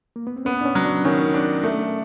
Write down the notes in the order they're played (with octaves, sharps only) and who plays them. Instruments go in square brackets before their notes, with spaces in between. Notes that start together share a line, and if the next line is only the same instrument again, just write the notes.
[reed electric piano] A#3
B3
C4
[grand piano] B3 [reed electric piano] C#4
[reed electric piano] D4
C#4
[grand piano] F#3
[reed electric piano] D4
[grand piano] D#3 [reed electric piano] C#4
[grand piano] D4
A3